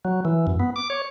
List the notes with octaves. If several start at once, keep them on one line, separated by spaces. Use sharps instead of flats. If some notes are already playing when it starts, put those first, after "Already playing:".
F#3
E3
F#2
B3
D6
C#5